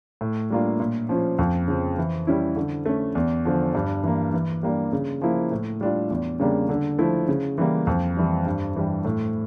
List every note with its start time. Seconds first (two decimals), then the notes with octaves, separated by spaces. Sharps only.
0.21 A2
0.50 G3 A#3 D4 F4
0.80 A#2
1.09 F3 C#4 F4
1.39 F2
1.68 C#3 F3
1.98 E3
2.27 G3 C#4 E4
2.56 D3
2.86 A3 C#4
3.15 E2
3.45 D3 F3
3.75 G2
4.04 E3 A#3
4.34 E3
4.63 G3 A#3 D4
4.92 C#3
5.22 F3 A#3 E4
5.52 A2
5.81 G3 D4 F4
6.10 E2
6.40 C#3 G3 A#3 D4
6.69 D3
6.99 F3 A3 E4
7.28 C#3
7.58 E3 G3 A#3
7.87 F2
8.17 E3 G3
8.46 G2
8.76 E3 G3
9.05 A2